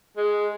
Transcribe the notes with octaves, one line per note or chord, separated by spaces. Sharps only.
G#3